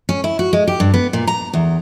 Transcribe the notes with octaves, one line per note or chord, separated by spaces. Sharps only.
C#4
E4
F#4
G#3
G4
G2
B3
A#2
A#5
E2